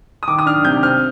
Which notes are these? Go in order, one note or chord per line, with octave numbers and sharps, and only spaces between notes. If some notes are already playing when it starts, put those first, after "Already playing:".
D#6
D#3 D6
D#6
D4 F6
C3 G6
C4 F6